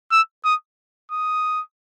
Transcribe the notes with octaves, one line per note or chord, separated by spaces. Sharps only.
E6
D#6
D#6